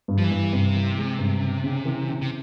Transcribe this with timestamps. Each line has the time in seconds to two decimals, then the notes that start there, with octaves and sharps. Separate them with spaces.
0.08 G2
0.18 F3
0.24 E3
0.31 G2
0.53 G2 C3
0.74 E3
0.97 G#3
1.18 G2
1.41 C#3
1.64 C#3
1.85 E3
2.07 C#3
2.22 C3